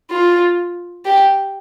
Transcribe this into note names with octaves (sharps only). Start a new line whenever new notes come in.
F4
G4